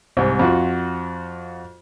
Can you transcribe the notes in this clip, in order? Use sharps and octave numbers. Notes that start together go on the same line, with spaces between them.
C2 G#2
F2 F4 F#4